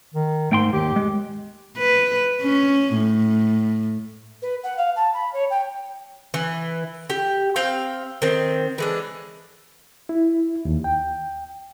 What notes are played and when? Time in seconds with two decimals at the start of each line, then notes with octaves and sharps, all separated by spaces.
0.14 D#3
0.52 G#2 A3 G5 C6
0.73 D#2 G4
0.96 G#3
1.78 B4
2.42 C#4
2.95 A2
4.42 B4
4.63 F#5
4.76 F5
4.95 A5
5.13 B5
5.33 C#5
5.50 G5
6.34 E3
7.10 G4
7.56 C4 F5 G5
8.22 D#3 C4
8.78 E3 G#3 D4
10.09 E4
10.65 D#2
10.84 G5